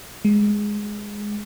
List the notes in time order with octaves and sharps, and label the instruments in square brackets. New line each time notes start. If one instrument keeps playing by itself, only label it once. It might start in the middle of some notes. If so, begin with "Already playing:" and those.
[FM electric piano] G#3